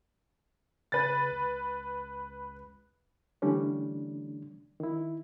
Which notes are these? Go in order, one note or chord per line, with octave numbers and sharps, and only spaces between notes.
C#3 B4 A6
C#2
D3 E3 G3 A3 C#4 D4
D#3 E4